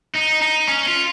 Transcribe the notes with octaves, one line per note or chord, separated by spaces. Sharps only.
D#4
D#4
C#4
F4